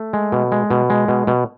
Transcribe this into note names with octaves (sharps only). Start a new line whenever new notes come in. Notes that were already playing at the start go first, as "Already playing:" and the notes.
Already playing: A3
G#3
B2
G#3
B2
G#3
B2
B2